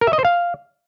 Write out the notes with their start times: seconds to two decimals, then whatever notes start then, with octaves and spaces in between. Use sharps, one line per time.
0.01 A#4
0.07 E5
0.13 D#5
0.19 C5
0.25 F5